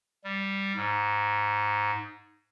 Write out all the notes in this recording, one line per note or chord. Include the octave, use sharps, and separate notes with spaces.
G3
G#2